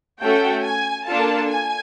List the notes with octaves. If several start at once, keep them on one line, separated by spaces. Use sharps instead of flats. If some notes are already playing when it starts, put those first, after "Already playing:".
A3 C#4 F#4 A4 G5
G#5
A#3 D4 F4 A4 A5
G#5